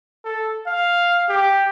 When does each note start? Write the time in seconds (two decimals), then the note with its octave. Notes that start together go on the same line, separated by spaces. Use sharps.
0.25 A4
0.67 F5
1.29 G4